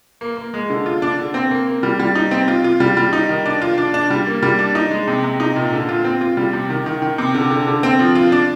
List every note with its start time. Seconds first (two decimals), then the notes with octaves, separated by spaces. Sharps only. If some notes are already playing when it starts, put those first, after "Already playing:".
0.21 A#3
0.37 A#3
0.54 G#3
0.70 D3
0.86 F4
1.02 D4
1.19 D3
1.34 C4
1.51 A#3
1.67 A#3
1.83 G3
2.00 G3
2.15 D#4
2.31 C4
2.48 F4
2.64 F4
2.80 G3
2.97 G3
3.13 D#4
3.29 D#3
3.46 D4
3.62 F4
3.78 D4
3.94 D4
4.11 G3
4.27 A#3
4.43 G3
4.59 D4
4.75 D#4
4.91 G#3
5.08 C3
5.24 C3
5.40 D#4
5.56 A#2
5.73 D3
5.89 F4
6.04 C4
6.21 F4
6.37 G3
6.53 C3
6.70 D#3
6.86 D#3
7.02 D#3
7.18 C3
7.34 D3
7.51 D3
7.67 D3
7.83 C4
7.99 F3
8.15 F4
8.32 D4